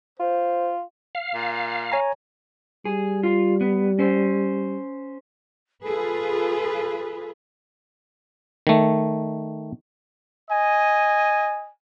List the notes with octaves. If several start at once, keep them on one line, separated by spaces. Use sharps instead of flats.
F4 C5
F5
A#2
C#5 G#5 A#5
G3 G#4
F4
B3
C#4 C5
F4 G#4 A4 B4
D#3 A3
D#5 G#5